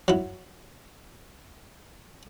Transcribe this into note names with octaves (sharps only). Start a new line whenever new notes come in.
F#3 E4